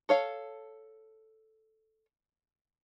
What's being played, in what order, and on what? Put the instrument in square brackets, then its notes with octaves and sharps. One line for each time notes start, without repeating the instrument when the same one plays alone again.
[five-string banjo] A4 C#5 F5